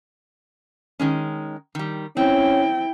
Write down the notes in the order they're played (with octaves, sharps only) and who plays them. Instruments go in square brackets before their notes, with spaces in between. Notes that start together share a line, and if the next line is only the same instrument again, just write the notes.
[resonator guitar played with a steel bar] D#3 G#3 C#4
D#3 G3
[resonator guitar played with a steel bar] C4 [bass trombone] C#4 [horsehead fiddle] E4 G5